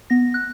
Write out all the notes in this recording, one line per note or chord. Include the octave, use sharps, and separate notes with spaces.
B3 A#6
F#6